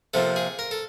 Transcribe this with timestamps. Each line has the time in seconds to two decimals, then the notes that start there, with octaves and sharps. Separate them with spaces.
0.14 C3 F3 A#3 A4
0.36 G#4
0.59 A#4
0.71 A4